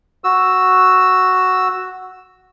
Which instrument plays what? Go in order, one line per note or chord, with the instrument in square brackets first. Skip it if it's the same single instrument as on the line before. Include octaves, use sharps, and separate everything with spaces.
[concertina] F#4 E6